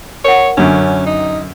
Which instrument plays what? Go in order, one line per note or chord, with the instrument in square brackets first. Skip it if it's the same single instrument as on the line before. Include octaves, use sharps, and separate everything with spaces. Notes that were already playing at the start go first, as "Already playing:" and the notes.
[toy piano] A#4 F#5 [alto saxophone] C#5
[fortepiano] F#2 D3 [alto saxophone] C#4
[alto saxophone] D#4